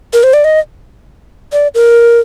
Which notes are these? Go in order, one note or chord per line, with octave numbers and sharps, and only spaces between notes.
A#4
C5
D5
D#5
D5
A#4